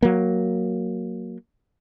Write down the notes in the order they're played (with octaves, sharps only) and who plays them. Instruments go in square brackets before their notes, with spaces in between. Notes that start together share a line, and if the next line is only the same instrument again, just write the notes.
[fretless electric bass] F#3 A#3